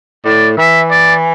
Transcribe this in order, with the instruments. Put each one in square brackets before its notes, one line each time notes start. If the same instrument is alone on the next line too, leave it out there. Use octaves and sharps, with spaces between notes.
[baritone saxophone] A2 [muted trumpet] D5
[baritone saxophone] E3 [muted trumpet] E5
[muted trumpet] D5